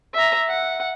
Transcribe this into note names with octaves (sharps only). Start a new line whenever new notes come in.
E5 A#5
F#5